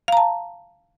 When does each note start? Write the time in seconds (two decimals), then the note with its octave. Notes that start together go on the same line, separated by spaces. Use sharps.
0.08 F5
0.12 A#5
0.17 A5